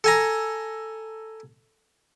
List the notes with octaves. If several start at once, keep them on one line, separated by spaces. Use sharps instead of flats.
A4 G#5 A#5